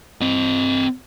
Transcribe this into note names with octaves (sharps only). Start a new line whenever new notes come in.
C4 D#5